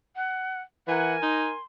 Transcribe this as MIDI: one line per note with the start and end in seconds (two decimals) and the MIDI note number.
0.16 0.61 78
0.88 1.17 52
0.88 1.56 70
0.88 1.12 78
0.88 1.56 80
1.22 1.50 63
1.22 1.64 84